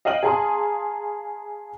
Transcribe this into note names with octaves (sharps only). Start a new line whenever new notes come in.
D#5 F5 G5 D#7 F#7
G#4 F5 A5 A#5 C6 D#6